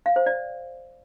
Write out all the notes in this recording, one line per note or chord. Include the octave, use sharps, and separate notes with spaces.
F5
C5
D5